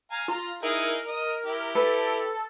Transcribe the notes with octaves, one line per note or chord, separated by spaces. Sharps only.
F5 G#5 A#5
F4 A#5
D#4 E4 G#4 A#4
D#5
E4 G4
A4 B4